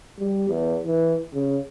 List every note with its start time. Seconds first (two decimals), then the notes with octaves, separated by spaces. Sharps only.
0.19 G3
0.48 E2
0.84 E3
1.33 C#3